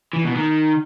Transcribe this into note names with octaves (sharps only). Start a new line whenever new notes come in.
E3
B2
D#3